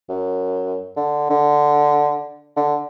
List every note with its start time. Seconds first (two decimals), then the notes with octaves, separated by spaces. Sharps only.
0.09 F#2
0.96 D3
1.30 D3
2.57 D3